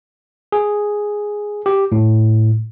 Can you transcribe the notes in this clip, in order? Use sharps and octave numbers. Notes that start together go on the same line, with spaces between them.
G#4
G4
A2